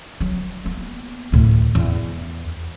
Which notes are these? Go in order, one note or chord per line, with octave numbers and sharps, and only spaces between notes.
F#3
A#3 B3
D2 A2
E2